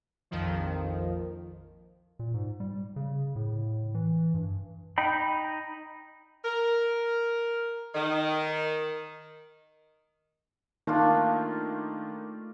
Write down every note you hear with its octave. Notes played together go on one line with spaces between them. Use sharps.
A#1 F2 D#3 F3
A#2
G#2
G3
C#3
A2
E3
G2
D#4 G5 B5
A#4
D#3
D#3 A3 A#3 D4 D#4 F4